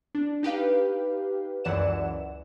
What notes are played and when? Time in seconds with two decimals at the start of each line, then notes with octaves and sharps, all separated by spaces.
0.15 D4
0.43 D#4 G4 B4 F5
1.64 C#2 F#2 E3 D5 F#5 E7